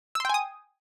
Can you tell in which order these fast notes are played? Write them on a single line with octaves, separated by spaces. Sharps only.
E6 C6 G5 G#5 D#6